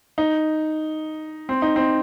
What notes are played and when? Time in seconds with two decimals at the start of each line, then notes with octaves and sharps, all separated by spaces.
0.18 D#4
1.49 C4
1.62 D#4
1.76 C4